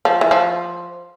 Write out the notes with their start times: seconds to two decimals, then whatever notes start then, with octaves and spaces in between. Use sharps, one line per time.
0.05 F3
0.21 E3
0.31 F3